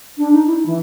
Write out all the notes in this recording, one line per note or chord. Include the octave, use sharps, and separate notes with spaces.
D4
D#4
E4
E3